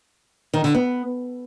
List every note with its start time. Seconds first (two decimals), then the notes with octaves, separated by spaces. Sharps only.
0.54 D#3
0.64 D3
0.74 B3